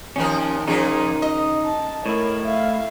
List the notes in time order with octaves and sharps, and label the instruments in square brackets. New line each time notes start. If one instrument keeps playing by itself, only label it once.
[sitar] D#2 F3 A#4 [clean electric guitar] C#4
[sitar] A#2 F3 G#4 [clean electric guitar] C#3 D#4 [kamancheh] A#4
[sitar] D#5
[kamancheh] A5
[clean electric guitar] A2 E4 [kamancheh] A#4 C#5
[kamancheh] E5 F5